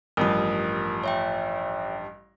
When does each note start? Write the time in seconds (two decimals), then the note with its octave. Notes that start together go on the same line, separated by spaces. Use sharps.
0.17 A1 G2 F3 A#4 D#6
1.04 C#5 E5 G5